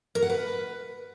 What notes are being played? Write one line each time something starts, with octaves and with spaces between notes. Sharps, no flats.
A#4
F#5
B4